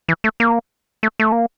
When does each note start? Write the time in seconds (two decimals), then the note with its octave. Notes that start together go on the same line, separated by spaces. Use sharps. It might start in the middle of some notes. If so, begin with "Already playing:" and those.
0.08 E3
0.24 A3
0.40 A#3
1.03 A3
1.20 A3
1.32 A#3